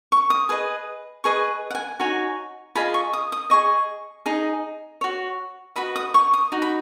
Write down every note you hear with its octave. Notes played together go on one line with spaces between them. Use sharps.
C#6
D#6
G#4 B4 D#5
G#4 B4 D#5 C#6
F#5
G#5
D#4 F#4 C#5 G#5
F4 G#4 D#5 B5
C#6
D#6
D#6
G#4 D#5 C#6
D#4 G#4 D#5
F#4 C#5
F#4 B4 D#5 B5
D#6
C#6
D#6
D#4 F#4
B5